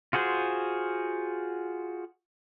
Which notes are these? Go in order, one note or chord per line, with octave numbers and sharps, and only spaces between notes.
F4 F#4 G#4 C5